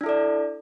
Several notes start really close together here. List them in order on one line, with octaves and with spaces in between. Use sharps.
D4 E4 A4 D5